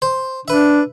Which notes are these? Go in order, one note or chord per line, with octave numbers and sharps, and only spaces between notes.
C5
D4 B4 E5